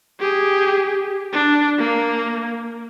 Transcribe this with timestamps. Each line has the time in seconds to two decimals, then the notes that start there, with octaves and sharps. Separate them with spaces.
0.20 G4 G#4
1.33 D4
1.79 A#3